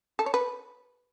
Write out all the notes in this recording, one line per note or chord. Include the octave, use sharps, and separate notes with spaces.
A4
C#5
B4